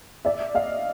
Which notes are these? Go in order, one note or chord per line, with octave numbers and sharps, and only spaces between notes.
D5 E5
D#5 F5